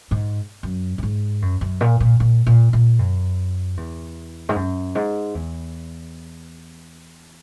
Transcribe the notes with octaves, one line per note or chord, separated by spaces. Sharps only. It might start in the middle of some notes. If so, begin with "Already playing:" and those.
G#2
F#2
F#2
G#2
F#2
F#2
A#2
A#2
A#2
A#2
A#2
F#2
E2
G#2
F#2
G#2
E2